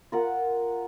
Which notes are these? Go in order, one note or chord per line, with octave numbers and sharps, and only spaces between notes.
F4 A#4 F#5